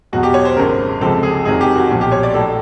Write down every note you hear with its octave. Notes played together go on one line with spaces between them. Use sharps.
E2 B2 F#3 F#4
G4
C#5
C5
G#1 F#2 C#3 A#4
C#2 C3 F3 G#3 A4
G#4
F2 C3 D#3 F#3 G#4
G4
F#4
B1 A#2 F3
G4
C#5
D5
A1 A2 F#3 A4